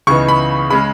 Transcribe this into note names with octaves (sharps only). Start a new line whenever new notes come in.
C#2 C#3 E3 B3 D#4 C#6
B5
C#3 G#3 C#4 B5